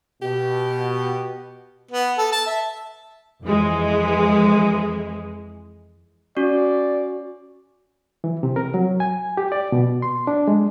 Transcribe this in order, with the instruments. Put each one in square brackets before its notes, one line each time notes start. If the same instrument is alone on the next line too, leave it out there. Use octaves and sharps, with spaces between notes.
[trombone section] B2 [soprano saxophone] G4
[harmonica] B3
A4
A5
E5
[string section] F2 E3 G#3
[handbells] C#4 F#4 [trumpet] D5
[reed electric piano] E3
C3
A#4
F#3
G#5
G4
D5
B2
C6
D4
G#3